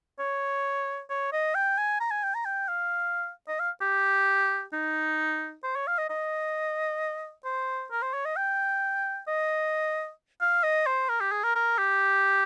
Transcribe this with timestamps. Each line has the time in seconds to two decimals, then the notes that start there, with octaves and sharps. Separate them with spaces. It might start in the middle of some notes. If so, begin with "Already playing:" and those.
0.19 C#5
1.10 C#5
1.33 D#5
1.55 G5
1.78 G#5
2.00 A#5
2.11 G#5
2.24 G5
2.35 A#5
2.45 G5
2.68 F5
3.48 D#5
3.60 F5
3.82 G4
4.73 D#4
5.64 C5
5.76 C#5
5.87 F5
5.98 D#5
6.10 D#5
7.45 C5
7.91 A#4
8.02 C5
8.14 C#5
8.25 D#5
8.37 G5
9.28 D#5
10.41 F5
10.63 D#5
10.87 C5
11.09 A#4
11.21 G4
11.32 G#4
11.44 A#4
11.55 A#4
11.78 G4